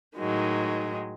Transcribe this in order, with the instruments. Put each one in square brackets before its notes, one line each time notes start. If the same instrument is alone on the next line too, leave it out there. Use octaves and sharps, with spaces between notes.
[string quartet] A2 D#3 F#3 G#3